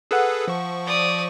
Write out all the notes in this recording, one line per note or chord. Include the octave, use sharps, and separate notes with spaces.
G#4 A4 B4 F#5 E6
F3 C#6
D5 D#6